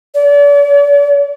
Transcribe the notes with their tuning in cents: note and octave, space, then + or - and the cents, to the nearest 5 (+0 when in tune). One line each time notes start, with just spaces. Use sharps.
D5 -40